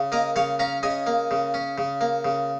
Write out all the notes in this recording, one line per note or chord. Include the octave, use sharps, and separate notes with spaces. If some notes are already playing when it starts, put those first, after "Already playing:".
Already playing: C#3
A#3 A#4 D#5
C#3 C#5 F5
C#4 F5 A#5
C#3 D#5 G#5
A#3
C#3
C#4
C#3
A#3
C#3